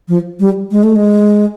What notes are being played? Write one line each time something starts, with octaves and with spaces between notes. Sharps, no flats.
F3
G3
G#3
A3
G#3